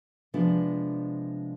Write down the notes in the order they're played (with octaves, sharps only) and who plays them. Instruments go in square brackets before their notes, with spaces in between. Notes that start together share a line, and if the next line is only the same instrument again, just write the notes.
[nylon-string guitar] C3 F3 G#3 B3 D4